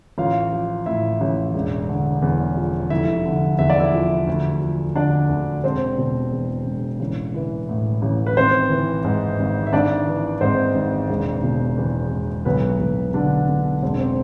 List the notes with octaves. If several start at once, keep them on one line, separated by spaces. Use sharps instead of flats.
A1 F4 F5
F3
A2 E4 E5
A1
E1
D3
E2
F3
F1 E4 E5
D3
E2 E5
D5
E4 E5
F3
D2
F3
D3 D4 D5
D2
E1 C4 C5
B2
E2
E1
A1
E3
A2
A1
B4
G#1 C4 C5
E3
G#2
G#1
E5
G#1 D4 D5
E3
G#2 C4 C5
G#1
E1
B2
E2
E1
B1 B3 B4
B1
B2 D3 D4
B2
E1 C4
C4